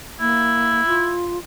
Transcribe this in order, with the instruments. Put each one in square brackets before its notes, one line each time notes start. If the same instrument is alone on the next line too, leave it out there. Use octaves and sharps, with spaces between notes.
[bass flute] A#3 [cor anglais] E4
[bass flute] F4